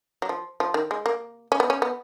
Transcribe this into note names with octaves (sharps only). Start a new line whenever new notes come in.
F#3
F3
F3
D#3
G#3
A#3
C#4
B3
C#4
B3